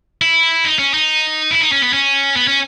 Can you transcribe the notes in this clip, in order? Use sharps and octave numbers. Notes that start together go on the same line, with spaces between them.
E4
D#4
C#4
D#4
E4
D#4
C#4
B3
C#4
B3
C#4